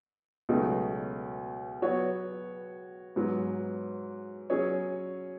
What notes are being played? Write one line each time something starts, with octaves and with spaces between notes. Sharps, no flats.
C#2 B2 F#3 A3 D#4
F#3 B3 F#4 C#5
G#2 F#3 B3
F#3 C#4 G#4 C#5